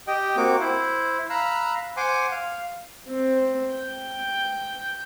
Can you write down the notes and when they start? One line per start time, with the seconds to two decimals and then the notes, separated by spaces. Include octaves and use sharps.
0.07 G4 D#5 G5
0.37 A#3 C4 F#4 D6
0.60 E4 C5
1.30 F5 A#5 B5 E6 F#6
1.97 C5 F#5 G#5 C6 D6
2.31 F5
3.09 C4
3.74 G5